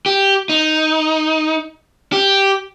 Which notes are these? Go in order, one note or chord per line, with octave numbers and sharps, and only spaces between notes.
G4
D#4
G4